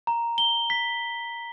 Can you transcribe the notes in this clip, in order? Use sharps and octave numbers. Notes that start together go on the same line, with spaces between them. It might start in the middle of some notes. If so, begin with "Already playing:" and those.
A#5
G7
B6